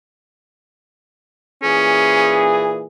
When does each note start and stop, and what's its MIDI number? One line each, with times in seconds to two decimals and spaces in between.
1.63 2.86 46
1.63 2.86 52
1.63 2.51 61
1.63 2.86 68